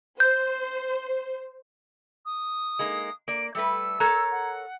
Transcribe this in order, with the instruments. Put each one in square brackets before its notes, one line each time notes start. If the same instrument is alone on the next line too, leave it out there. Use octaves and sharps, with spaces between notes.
[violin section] C5 [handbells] G6
[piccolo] D#6
[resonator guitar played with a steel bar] G#3 A#3 D#4
[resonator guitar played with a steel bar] A#3 D5 [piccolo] D7
[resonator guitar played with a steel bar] G3 A3 B4 [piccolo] E6
[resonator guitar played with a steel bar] A4 A#4 C#5 [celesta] A#5 F#6 G#6
[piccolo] F#5